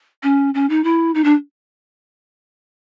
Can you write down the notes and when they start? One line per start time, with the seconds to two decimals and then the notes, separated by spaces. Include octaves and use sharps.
0.23 C#4
0.54 C#4
0.69 D#4
0.84 E4
1.15 D#4
1.24 D4